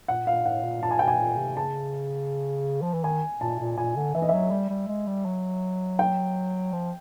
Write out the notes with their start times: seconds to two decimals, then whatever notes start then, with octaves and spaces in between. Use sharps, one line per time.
0.08 A#2 F#5
0.27 A#2 F5
0.45 A2 F#5
0.63 A#2
0.83 A#2 A5
0.91 G#5
0.99 B2 G5
1.08 G#5
1.19 A#2
1.37 C3
1.56 C#3 A5
2.82 F3
2.93 E3
3.04 D#3 G#5
3.41 A#2 A5
3.60 A#2
3.77 A#2 G#5
3.96 D3
4.15 E3 E5
4.22 D#5
4.29 F#3 E5
4.51 G3
4.70 G3
4.88 G#3
5.07 G3
5.25 F#3
5.99 G5
6.73 F3